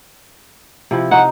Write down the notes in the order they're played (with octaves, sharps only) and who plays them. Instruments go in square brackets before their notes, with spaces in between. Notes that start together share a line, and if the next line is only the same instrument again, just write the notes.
[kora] C3 F3 E4
[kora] D#4 [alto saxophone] F#5